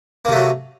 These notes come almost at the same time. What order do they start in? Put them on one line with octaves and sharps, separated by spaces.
A#3 C3 A3 F#3